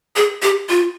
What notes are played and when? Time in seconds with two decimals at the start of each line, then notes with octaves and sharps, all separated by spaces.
0.16 G#4
0.42 G4
0.69 F4